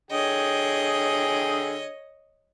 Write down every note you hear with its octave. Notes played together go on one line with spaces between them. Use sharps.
D3 G#4 C#5 D#5 G5